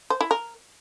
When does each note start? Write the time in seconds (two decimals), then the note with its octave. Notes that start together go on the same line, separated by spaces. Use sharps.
0.10 C5
0.21 E4
0.31 A#4